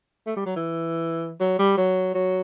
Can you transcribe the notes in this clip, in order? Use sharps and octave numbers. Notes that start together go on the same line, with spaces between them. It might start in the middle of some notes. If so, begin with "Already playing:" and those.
A3
G3
F#3
E3
F#3
G3
F#3
F#3